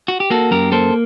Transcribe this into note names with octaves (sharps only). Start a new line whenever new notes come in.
F#4
G4
A#3 F#4 A4
F#2 G4 A#4
A#3 A4 C5